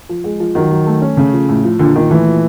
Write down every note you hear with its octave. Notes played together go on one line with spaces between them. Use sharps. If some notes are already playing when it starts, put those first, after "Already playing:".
F3
G#3
F3
D#3 F#3
F#3
A3
C#4
C#3 A3
F3
A2
F3
A#2 D3
A#2 D#3
E3 A3
A#2